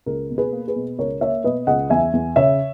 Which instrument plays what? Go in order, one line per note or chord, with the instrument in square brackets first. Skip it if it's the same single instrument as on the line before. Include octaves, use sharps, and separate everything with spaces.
[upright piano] C#2 A#4
B2
G#4 B4
A#3
G#4 B4
B2
C#2 A#4 C#5
A#3 C#5 E5
B2 B4 D#5
C#2 D#5 F#5
E2 E5 G#5
E2
C#3 C#5 E5